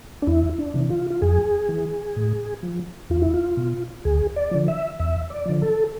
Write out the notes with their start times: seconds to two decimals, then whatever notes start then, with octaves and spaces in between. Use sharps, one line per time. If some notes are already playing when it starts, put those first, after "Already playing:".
0.22 D4
0.27 E2 E4
0.58 D4
0.74 C3 E3
0.90 F4
1.10 F4
1.22 F2 G#4
1.69 E3
2.16 A2
2.63 F3
3.10 E2 F4
3.22 E4
3.34 F4
3.57 B2
4.05 D2 G#4
4.36 D5
4.51 D3 F3
4.68 E5
4.99 E2 E5
5.30 D5
5.45 D3 F3
5.62 A4